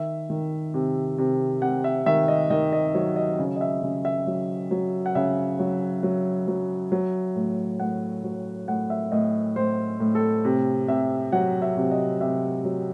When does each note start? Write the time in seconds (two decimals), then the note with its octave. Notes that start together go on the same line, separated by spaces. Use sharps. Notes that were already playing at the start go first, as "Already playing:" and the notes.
Already playing: D#3 E5
0.30 D#3
0.74 C3
1.18 C3
1.62 C3 F#5
1.84 E5
2.06 D#3 E5
2.28 D#5
2.50 D#3 D#5
2.72 D#5
2.95 F#3 C#5
3.16 D#5
3.39 C#3
3.56 D#5
3.61 E5
3.83 C#3
4.05 E5
4.27 F#3
4.71 F#3
5.06 F#5
5.15 C#3 E5
5.59 F#3
6.03 F#3
6.48 F#3
6.92 F#3
7.36 A2
7.79 A2 F#5
8.24 F#3
8.68 A2 F#5
8.90 E5
9.12 A2 D#5
9.56 A2 C5
10.00 A2
10.15 A4
10.45 C3
10.88 C3 E5
11.32 F#3 F#5
11.62 E5
11.77 C3
11.91 D#5
12.21 C3 E5
12.65 F#3